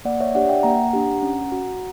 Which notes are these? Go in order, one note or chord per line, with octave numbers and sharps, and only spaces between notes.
A#3 D5 F#5
C#5 E5
D4 G4 D5 F#5
E5 G5
A#3 F#5 A#5
D4 G4
C#4
F#4